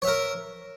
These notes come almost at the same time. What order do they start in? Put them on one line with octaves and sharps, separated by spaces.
C#5 E5 A#4